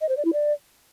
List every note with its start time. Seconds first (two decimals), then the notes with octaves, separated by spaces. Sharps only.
0.01 D#5
0.09 C5
0.17 D5
0.25 E4
0.33 D5